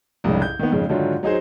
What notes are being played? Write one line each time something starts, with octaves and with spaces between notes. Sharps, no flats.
C2 F2 G#2 C#3
G6
D#3 A#3 B3
F2 G#2 C#3
G#2 D3 D#3 F#3 F4
F#3 D#4 G#4 C5